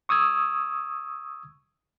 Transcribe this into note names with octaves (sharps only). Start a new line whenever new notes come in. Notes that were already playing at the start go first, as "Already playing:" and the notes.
C#6 D#6 E6 G#6